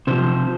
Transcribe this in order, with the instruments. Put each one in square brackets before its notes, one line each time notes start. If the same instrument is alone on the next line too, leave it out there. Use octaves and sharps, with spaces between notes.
[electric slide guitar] C3 F3 C5